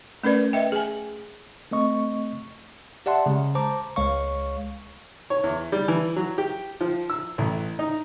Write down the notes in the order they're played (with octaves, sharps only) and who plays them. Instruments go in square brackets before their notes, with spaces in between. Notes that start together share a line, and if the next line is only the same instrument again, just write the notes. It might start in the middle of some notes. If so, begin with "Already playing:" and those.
[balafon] A3 C#4 A#4 B4 D5
B4 D#5 E5 G5
G#4 G#5
[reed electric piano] A3 C4 D#5 C#6
[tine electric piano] G4 D5 E5 F#5 A5 C6
C#3 G#3
C5 A5 A#5 D6
C#2 G#3 C#5 F5 C#6
[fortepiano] C#5
E2
G3
E3
F#3
G4
F3
E6
A1
D#4